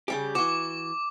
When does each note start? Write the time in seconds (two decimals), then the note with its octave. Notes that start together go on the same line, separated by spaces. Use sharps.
0.08 C#3 G3 G4
0.35 E3 F#4 D6